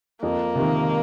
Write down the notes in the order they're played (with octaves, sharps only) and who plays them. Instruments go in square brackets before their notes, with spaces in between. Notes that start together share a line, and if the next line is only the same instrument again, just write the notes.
[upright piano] F2 [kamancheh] A#3
[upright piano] C3 D#3